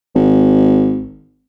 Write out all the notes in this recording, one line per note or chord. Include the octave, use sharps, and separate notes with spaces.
G#1